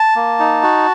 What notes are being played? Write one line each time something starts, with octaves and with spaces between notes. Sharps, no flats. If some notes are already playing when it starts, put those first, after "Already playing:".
Already playing: A5
A#3
D#4
F#4